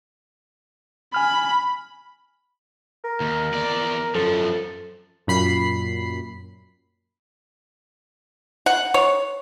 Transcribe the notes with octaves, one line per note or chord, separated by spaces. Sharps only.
G#5 B5 F6
A#4
D#2
E2 D5
F#2 F3 A4
F#2 A#2 B5 C7
F#5
C#5